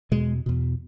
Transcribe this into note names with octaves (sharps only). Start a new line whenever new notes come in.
E2 B2 G#3
E2 B2